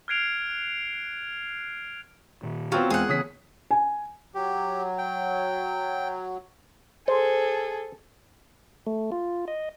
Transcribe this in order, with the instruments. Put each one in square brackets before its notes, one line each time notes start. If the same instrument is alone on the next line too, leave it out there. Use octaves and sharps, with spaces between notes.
[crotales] F6 F#6 G#6 C7 D7 F7
[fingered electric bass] A#2 D#3
[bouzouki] F#3 [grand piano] B3 C4 F4
[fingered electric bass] E2 G#3 [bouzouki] G#4 F#5
[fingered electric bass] C#3 E3 B3 [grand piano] C#4 D#6 B6
[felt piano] G#5
[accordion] F#3 [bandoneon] G4
[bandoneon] G5
[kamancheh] G#4 A4 [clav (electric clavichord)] C5
[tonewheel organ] A3
F4
D#5